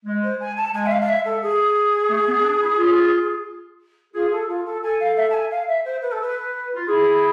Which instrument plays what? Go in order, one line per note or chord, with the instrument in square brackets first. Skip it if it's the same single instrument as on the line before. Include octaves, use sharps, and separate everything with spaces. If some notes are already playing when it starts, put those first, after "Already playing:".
[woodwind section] G#3
[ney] C5
G#5
A5
[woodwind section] G#3 [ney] G#5
[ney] E5
F5
F5
E5
A4
G#4
[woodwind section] A3
B3
D4
E4
F4
[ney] F4 [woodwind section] G#4
[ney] A4
F4
A4
[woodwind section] A4 [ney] G#5
[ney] F5
E5
A5
G#5
F5
E5
C5
B4
A4
B4
[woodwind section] F4
[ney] E4 [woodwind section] G#4